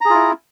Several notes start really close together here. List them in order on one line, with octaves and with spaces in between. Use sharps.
A#5 G#4 F4 E4